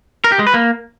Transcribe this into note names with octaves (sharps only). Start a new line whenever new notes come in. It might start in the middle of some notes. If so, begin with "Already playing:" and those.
A#4
G4
G#3
B4
A#3